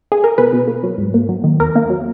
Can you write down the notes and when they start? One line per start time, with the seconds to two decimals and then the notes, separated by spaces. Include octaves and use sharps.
0.12 G#4
0.24 A#4
0.38 B2 B4
0.53 B2
0.68 A#3
0.83 F#3
0.98 G#2
1.14 A#3
1.29 F#3
1.44 D#3
1.60 E2 A#4
1.75 A#3
1.90 F#3